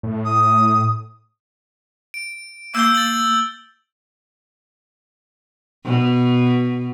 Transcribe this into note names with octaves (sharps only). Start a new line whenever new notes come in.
A2
D#6
D7
A#3 E6 G6 G7
A6 F#7
B2